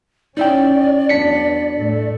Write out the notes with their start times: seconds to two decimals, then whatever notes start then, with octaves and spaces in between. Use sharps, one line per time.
0.37 C#4 D#4 E4 D5 G5
1.09 E2 F#3 B3 D4 B6 C#7
1.74 A2 A3